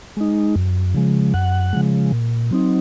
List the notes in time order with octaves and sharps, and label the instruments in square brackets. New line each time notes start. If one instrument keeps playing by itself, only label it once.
[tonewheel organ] G#3 D#4
F#2
C#3 F3 G#3
F#2 F#5
C#3 F3 G#3
A#2
F#3 C4 D#4